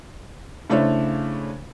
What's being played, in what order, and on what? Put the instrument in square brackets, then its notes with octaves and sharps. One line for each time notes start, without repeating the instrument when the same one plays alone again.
[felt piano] C#3 A3 D4 E4 C5 C#5